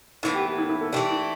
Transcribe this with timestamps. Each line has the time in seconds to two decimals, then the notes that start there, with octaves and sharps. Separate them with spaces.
0.23 A2 E3 B3 E4
0.34 G4
0.46 G4
0.58 E4
0.69 E4
0.81 A4
0.93 E3 A3 D4 G4
1.10 E4